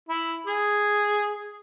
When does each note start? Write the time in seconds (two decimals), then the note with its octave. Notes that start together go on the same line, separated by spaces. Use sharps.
0.09 E4
0.47 G#4